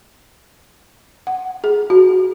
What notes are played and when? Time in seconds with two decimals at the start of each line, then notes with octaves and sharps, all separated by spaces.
1.27 F#5
1.64 G#4
1.90 F#4